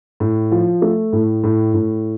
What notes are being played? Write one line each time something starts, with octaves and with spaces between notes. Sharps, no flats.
A2
F3
A3
A2
A2
A2